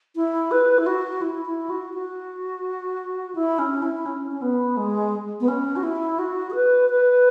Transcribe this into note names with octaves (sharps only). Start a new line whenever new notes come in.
E4
B4
E4
F#4
E4
E4
F#4
F#4
E4
C#4
E4
C#4
C#4
B3
G#3
B3
C#4
F#4
E4
F#4
G#4
B4
B4